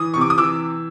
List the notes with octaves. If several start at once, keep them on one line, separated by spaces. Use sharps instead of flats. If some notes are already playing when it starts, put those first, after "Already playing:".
Already playing: E3 D#6
C3 C#6
D6
D#6
E3 D6 E6